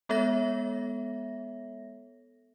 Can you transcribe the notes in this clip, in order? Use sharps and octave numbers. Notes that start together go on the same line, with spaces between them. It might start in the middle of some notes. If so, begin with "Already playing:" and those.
G#3 B3 A4 C#5 E5 A#6